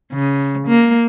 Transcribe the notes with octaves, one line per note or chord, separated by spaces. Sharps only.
C#3
A#3